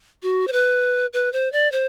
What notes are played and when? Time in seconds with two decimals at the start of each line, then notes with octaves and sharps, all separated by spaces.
0.23 F#4
0.47 C5
0.52 B4
1.13 B4
1.33 C5
1.52 D5
1.72 C5